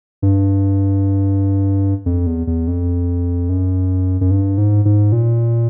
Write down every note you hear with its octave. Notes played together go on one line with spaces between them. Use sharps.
G2
F2
E2
E2
F2
F#2
F#2
G2
G#2
G#2
A#2